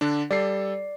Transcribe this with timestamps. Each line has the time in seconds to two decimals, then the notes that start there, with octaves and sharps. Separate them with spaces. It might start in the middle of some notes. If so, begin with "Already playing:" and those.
0.01 D3 D4
0.31 G3 A4 D5 C7